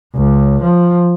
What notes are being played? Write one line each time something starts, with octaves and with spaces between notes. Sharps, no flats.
C#2
F3